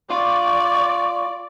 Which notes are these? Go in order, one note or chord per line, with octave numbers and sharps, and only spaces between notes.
F4 D5 C#6